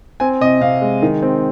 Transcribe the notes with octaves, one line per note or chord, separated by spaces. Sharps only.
C4 G#5
C3 D#5
C3 F5
G#3
D#3
C4